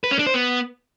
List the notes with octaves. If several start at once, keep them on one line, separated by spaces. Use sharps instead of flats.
B4
C#4
D4
C5
B3